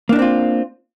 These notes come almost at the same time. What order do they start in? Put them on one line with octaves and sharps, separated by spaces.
A#3 D4 D#4 C4 F4